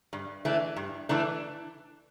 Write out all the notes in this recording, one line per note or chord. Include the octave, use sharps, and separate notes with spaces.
G2
E3 A3 D4
G2
E3 A3 D4